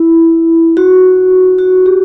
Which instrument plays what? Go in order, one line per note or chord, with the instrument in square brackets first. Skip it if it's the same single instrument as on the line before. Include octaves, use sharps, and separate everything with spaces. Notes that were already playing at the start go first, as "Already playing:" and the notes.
Already playing: [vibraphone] E4
F#4
F#4
G4